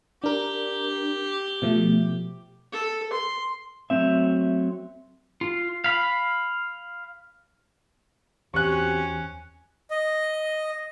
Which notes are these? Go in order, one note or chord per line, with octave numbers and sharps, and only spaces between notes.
D4 G4 A#4
B2 F3 A3
A4
C6
F#3 A3 C4 E5
F4
F5 B5
E2 C4 C#4 F#4 G4 C#6 F#6
D#5